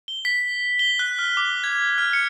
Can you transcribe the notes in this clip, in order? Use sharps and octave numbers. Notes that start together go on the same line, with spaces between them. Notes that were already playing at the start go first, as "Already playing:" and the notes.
G7
B6
G7
F#6
F6
D6
G#6
F6
C#7